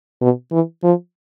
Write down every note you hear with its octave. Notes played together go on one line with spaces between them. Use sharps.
B2
E3
F3